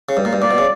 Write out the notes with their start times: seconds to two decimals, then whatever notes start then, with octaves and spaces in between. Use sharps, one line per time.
0.09 C#3
0.17 G2
0.25 A#2
0.33 G2
0.42 A#2 D5
0.51 B2
0.58 C#3